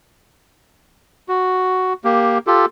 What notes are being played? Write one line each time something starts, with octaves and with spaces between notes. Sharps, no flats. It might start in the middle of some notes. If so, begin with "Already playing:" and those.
F#4
A#3 G4
F4 G4 A4